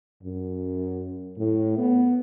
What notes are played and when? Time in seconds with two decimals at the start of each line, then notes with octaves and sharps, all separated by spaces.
0.23 F#2
1.38 A2
1.78 B3